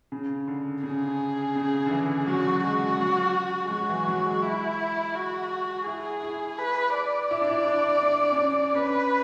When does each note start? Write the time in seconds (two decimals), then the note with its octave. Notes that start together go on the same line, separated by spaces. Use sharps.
0.12 C#3
0.48 D3
0.83 C#3 G#4
1.55 C#3
1.86 D3
1.91 E3
2.27 F#3 F#4
2.63 G#3 F#4
2.99 F#3
3.65 G#3
3.71 F#3 F#4
3.89 E3
4.08 F#3
4.26 G#3
4.43 E4
5.15 F#4
5.86 E4 G#4
6.23 E4
6.59 B4
6.95 D5
7.31 E4
7.41 D4
7.51 E4
7.67 D4
8.02 D4
8.32 C#4
8.38 D4
8.74 C#4 B4